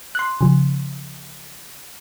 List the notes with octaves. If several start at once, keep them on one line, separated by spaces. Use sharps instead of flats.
C6 F#6
C#3 F3